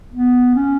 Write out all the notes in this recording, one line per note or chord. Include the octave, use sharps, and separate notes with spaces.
B3
C#4